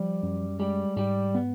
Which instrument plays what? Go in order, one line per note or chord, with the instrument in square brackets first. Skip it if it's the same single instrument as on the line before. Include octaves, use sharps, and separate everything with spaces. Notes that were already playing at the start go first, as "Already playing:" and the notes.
Already playing: [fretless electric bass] F3 [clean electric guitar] G3
[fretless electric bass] F#2
[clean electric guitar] G3 [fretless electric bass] G#3
[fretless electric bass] G#2 [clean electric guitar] G3
[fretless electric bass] B3